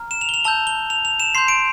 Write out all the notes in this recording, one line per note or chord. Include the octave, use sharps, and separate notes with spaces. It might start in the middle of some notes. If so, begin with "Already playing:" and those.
Already playing: A#5 F6
E7
F7
G7
F7
A5 E6 G6 G7
G7
F7
F7
E7
C6 G6 C7
D7